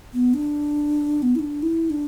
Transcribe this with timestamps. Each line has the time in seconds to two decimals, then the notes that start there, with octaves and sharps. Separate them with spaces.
0.13 B3
0.34 D4
1.22 B3
1.35 E4
1.39 D4
1.63 E4
1.90 D4